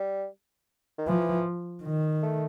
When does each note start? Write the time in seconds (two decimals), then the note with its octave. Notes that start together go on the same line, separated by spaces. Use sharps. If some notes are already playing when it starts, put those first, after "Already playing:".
Already playing: G3
0.98 D#3
1.07 E3 F3
1.84 D#3
2.23 A3